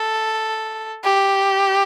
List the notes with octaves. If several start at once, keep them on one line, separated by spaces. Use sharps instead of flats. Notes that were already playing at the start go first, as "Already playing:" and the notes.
Already playing: A4
G4